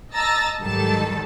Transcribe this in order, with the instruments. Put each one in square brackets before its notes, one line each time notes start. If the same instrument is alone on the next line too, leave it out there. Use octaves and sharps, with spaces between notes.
[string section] D#5 A5 A#5 E6 A6 A#6
G#2 D#3 F#3 G3 A4 A5